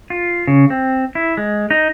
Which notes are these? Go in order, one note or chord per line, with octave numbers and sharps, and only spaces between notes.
F4
C#3
C4
E4
G#3
D#4